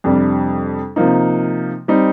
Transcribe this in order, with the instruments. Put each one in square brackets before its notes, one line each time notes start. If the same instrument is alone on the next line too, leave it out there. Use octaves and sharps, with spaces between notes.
[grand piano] F2 C3 G3 D4
C3 F3 A#3 D#4
G3 C4 D#4